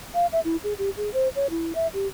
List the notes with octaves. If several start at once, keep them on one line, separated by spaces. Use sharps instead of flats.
F5
E5
E4
G#4
G4
G#4
C5
C#5
E4
E5
G4